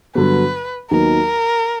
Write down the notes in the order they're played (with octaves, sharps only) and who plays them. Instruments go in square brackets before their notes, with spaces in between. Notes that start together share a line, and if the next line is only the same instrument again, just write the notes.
[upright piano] G2 D3 F#3 B3 [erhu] B4
[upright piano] D#2 D#3 F#3 B3 [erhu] A#4